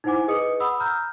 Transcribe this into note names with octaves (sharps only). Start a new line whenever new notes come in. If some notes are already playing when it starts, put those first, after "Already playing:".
D#4 E4 C5 F#5 G#5 D6
G#4 B4 D#5 D#6 C#7
F#5 B5 D#6 E6
A#5 F6 G6